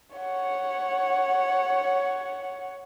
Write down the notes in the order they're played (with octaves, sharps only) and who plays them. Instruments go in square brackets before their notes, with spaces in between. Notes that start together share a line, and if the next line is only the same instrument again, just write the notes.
[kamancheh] C#5 F#5